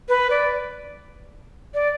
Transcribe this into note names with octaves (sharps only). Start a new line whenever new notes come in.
B4
D5
D5